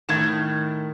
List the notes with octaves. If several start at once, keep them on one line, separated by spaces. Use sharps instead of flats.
A2 D#3 A3 G#6 E7